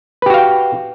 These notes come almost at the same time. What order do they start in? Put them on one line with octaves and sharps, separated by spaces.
B4 G4 F#4 F5 G5